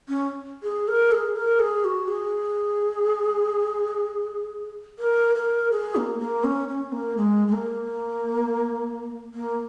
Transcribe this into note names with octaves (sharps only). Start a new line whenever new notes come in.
C#4
G#4
A#4
G#4
A#4
G#4
F#4
G#4
A#4
A#4
G#4
A#3
A#3
C#4
C#4
A#3
G#3
G#3
A#3
A#3